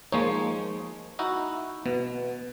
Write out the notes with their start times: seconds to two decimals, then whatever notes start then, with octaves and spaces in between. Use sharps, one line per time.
0.12 F3 G#3 A#3 D#4 C#5
1.19 D#4 E4 F#4
1.86 B2 B3